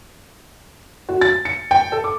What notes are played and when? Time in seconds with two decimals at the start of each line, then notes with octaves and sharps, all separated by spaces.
1.09 F#4
1.21 A6
1.45 C#7
1.71 G5
1.92 A4
2.04 D6